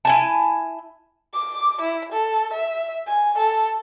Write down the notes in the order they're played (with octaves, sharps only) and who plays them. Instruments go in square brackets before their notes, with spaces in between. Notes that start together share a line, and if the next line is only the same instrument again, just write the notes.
[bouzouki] E4 G#5 A5
[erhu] D6
E4
A4
E5
G#5
A4